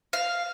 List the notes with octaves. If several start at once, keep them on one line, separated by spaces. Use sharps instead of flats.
F5